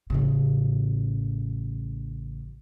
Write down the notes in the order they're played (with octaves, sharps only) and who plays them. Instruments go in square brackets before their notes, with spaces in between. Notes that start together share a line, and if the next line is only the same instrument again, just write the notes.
[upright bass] A1 C#3